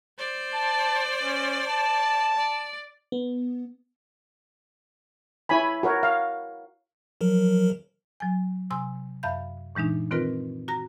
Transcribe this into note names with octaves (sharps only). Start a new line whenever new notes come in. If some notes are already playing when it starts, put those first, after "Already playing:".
C5 D5
A5
C#4
A5
D5
B3
E4 C#5 G#5 B5
F#4 A#4 C#5
F5
F3 F#3 A#4
F#3 G#5
C3 G#5 C6 E6
F#2 E5 F5 B5 G6
A#2 E3 G#3 D4 D#4
D#3 C4 F4 A#4 B4
F#4 A#5 A#6